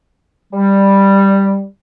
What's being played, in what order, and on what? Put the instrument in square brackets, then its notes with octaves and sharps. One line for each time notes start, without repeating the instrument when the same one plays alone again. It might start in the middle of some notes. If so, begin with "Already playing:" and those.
[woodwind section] G3